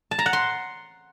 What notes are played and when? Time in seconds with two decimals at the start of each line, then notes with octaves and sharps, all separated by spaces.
0.11 A5
0.19 A#5
0.26 F#5
0.33 C6